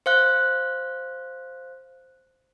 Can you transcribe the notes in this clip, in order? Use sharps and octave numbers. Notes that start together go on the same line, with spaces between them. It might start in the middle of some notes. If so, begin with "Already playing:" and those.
C5 F5 F#6